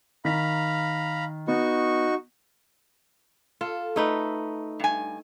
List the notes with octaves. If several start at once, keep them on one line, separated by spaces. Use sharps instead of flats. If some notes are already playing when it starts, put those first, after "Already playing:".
D#3 F5 A#5 B5 B6
B3 D#4 F#4 C#6
F4 A4
A3 D#4 B4
G2 G#5